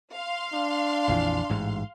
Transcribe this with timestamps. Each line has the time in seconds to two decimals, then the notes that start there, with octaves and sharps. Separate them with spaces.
0.14 F5 C6
0.53 D4
1.08 A#1 F2 E3
1.50 A1 G#2